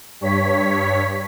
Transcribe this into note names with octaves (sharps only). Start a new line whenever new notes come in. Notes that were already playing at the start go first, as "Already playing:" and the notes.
G2 C#5 B6